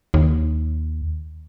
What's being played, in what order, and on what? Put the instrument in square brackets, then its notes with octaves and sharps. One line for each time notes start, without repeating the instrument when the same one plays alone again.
[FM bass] D#2